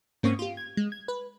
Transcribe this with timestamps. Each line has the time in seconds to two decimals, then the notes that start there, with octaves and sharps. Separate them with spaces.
0.23 G#2 A#3 C4 C#4 C#6 D#6
0.39 F4 G4
0.57 G#6
0.77 G#3
0.92 G#6
1.08 B4